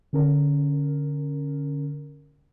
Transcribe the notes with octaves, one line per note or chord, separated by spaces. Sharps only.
D3 C#4 A#4